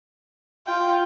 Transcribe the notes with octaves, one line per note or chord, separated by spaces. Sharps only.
F4 G5